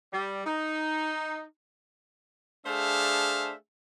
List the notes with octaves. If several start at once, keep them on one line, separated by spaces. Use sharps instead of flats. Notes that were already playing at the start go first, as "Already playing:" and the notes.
G3
D#4
A3 D4 G#4 C5 E5 F5